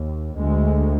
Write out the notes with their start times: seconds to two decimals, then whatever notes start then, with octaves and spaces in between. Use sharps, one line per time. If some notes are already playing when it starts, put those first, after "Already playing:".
Already playing: D#2
0.37 D2 G#3